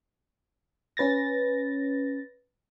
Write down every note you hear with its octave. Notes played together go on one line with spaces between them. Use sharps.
C#4 B4 A6 A#6